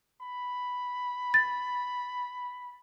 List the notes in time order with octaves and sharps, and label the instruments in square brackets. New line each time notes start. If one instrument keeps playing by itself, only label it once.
[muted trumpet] B5
[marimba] A6